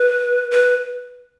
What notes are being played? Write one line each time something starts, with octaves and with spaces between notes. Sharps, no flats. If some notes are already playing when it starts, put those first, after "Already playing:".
Already playing: B4
B4